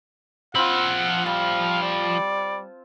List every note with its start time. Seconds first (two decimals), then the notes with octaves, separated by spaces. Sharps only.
0.55 F3 C4 F4 F#5 B5
1.26 G3 F5 A5
1.82 D5